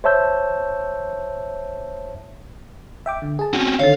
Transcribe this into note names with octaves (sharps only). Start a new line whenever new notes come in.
C5 C#5 E5 A5 E6 G6
E5 G5 D6
D3
G#4 A5
C4 C#4 F#4
D3 D#3 A4 C#5 F5